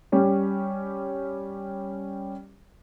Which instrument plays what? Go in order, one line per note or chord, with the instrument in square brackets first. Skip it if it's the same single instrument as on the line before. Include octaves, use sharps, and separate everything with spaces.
[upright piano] G3 C#4 G4